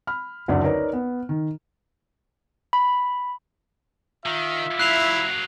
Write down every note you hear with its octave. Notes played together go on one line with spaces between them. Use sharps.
B5 F6
F#1 D2 D3 D5
D#4 A#4 B4 C#5 D5
B3
D#3
B5
D#3 F4 E5
F#3 A#3 E4 F#6 C7 F7